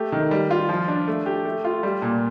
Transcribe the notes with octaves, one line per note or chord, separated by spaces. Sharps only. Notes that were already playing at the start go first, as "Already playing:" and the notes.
Already playing: A3 G4
D#3
G3
F4
F3
D4
A3
G4
A3
F4
G3
A#2